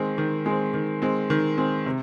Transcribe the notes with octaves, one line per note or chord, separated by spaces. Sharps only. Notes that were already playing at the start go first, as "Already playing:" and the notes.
Already playing: D#3 G#3 C4
D#3
G#3 C4
D#3
G#3 C4
D#3
G#3 C4
C3